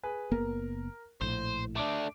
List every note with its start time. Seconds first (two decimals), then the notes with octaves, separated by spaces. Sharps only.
0.03 G#4 B4 G#5
0.32 F#1 A#3 B3 A#4
1.21 A#1 A2 C5 E7
1.76 A3 D4 D6 D7